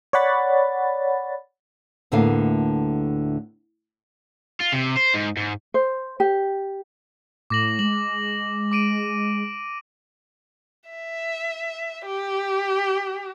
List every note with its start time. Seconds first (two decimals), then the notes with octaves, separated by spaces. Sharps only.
0.13 C#5 D5 F#5 B5 A6
2.12 D2 A2 D3 A#3 B3 F5
4.60 F4
4.72 C3
4.97 C5
5.14 G#2
5.37 G#2
5.74 C5
6.20 G4
7.50 A2 D6 A#6 F#7
7.79 G#3 F#7
8.72 D6 D7 D#7
10.90 E5
12.06 G4